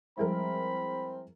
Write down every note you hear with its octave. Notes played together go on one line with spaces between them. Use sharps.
F3 G3 G#3 C4 E4 G#4 A#4 B5